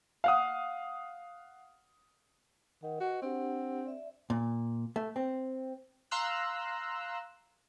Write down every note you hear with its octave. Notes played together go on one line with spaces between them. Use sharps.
F5 F#5 D#6
D#3 F#5
F#4 B4 D#5 C#6
C4 D4 G4 F#5
D5 E5
A#2
A3
C4
F5 A#5 C6 E6 F#6